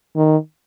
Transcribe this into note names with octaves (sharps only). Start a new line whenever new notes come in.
D#3